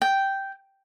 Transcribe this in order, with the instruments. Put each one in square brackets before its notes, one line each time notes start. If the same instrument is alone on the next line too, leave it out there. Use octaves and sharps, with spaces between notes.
[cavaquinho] G5